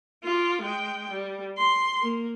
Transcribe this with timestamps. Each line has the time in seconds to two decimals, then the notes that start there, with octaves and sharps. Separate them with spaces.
0.24 F4 D6
0.62 G#3 G5
1.12 G3
1.58 C6
2.02 A#3